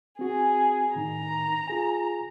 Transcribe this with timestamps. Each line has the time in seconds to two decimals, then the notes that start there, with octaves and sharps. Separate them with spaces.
0.19 C4 F#4 G#4
0.95 A2 D#3 D#4 A#5
1.68 F4 G#4 G#5